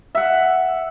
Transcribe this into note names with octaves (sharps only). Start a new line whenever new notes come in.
E5 F#5